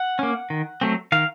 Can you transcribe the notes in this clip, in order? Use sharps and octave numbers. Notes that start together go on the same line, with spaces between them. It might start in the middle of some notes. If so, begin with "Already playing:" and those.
Already playing: F#5
A#3 C#4
D#3
F#3 A3 C4
D#3 F5